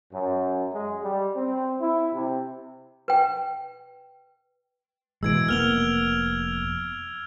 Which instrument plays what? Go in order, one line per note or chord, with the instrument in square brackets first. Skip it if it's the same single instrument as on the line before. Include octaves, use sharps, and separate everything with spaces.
[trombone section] F#2
G#3
G3
C4
E4
C3
[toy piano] B4 G5
[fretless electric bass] B2 E3 G#3 [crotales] E6 G#6 D7
[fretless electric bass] F1 A#3 B3 [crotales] F6 F7 G7